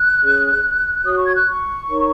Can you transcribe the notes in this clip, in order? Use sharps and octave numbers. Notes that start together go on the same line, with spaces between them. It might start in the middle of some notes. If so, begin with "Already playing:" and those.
Already playing: F#6
C#4 G#4 C#5
F#4 C#5 D#6
C#6
G#6
F#6
C#6
D#4 A#4 C#5